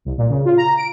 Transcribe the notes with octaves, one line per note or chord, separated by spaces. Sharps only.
C2
A#2
C#3
F4
A#5
D7